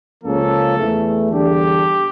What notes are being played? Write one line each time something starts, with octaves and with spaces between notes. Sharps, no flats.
C#2 C#3 F3 A#3 C#4 A4
E2 E3 A3
E2 D3 G3 D4 G4